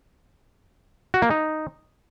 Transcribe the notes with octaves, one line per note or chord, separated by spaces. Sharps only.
F#4
A#3
D#4